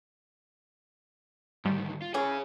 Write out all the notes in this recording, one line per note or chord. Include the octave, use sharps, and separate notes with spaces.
D2 G#2 D#3 G3
F4
E3 C#4 G#4 C#5